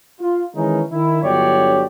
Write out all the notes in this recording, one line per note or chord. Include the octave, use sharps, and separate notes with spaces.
F4
D#3 E3 G#3 C#4 D#4
D#3 E4
G1 D3 F#3 G4 C#5 D5